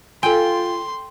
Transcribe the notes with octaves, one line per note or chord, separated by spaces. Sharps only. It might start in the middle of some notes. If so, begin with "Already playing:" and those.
F4 A4 G5 G#5 C6